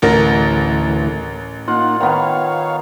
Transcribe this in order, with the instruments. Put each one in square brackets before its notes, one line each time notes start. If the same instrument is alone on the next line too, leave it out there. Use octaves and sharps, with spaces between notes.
[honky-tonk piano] A1 A#4 [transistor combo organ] D2 E3 A3
[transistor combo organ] A#3 D#4 F#5 [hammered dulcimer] F4
[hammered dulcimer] D#3 B3 [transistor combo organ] C#5 F5